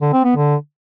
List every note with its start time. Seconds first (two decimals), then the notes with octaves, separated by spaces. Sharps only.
0.01 D3
0.13 C4
0.24 B3
0.36 D3